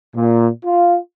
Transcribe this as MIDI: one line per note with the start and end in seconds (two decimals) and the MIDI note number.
0.16 0.49 46
0.66 0.97 65